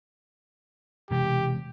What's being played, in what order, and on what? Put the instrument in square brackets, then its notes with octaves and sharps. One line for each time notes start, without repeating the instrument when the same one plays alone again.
[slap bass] E1 C3 G#3 [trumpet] G4